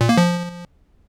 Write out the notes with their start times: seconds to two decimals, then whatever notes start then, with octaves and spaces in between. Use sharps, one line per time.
0.01 A#2
0.09 A#3
0.17 F3